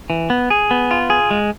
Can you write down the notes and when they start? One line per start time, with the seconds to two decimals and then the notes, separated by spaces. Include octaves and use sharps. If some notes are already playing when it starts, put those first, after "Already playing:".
0.10 E3
0.30 B3
0.50 G#4
0.71 B3
0.91 F4
1.10 G#4
1.31 G#3